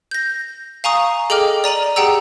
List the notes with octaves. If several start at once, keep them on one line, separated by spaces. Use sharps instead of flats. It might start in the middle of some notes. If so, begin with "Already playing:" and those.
G6 A#6
F5 G#5 A#5 C#6 D#6
G#4 A4 D#5 G5 D6 F6
D5 A#5 D#7 F#7
G4 G#4 F#5 G5 A#5 E6